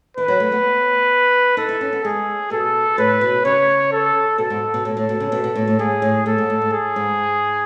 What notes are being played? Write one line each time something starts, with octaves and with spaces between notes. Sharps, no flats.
D#3 B4
F#3
A3
B3
D#4 A4
E4
C#4
B3
G#3 G#4
B2 A4
A2 B4
B2
C#3 C#5
A4
B2 A4
G#2
B2
A2 A4
A2
B2
C#3
B2
B2
A2
A2
G#2 G#4
A2
A2 A4
G#2
A2
G#2
G#4
G#2